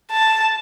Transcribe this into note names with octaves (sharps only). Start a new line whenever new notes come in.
A5